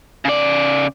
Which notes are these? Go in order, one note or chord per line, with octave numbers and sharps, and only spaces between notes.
C#3 D5